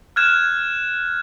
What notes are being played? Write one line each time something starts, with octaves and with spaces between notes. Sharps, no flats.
F6 F#6 G#6 E7